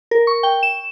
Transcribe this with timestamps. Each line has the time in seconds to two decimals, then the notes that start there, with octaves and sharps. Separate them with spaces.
0.11 A#4
0.27 C#6
0.43 G5
0.63 E7